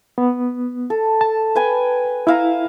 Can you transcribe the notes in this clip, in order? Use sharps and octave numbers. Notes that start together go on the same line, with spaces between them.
B3
A4
A5
B4 G5 G#5
E4 E5 F5 A#5